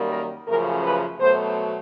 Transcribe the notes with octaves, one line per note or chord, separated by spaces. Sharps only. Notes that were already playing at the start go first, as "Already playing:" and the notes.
Already playing: F#2 D#3 G3 A#3
A#4
F#2 C#3 F3 A3 A#4
B4
B2 F#3 A3 C5